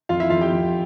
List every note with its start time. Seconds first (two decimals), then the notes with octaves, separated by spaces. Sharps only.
0.09 F2 F4 F5
0.20 E4 E5
0.30 F2 F4 F5
0.41 G4 G5
0.52 F2